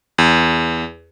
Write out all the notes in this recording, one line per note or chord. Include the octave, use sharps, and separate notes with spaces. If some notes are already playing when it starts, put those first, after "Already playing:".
E2